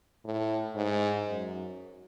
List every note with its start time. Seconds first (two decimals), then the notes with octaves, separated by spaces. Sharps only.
0.24 A2
0.75 G#2
1.27 F#2